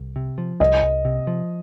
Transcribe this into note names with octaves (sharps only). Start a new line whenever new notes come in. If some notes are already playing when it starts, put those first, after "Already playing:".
Already playing: C2
C3
F3
C2 D#5
C2
C3
F3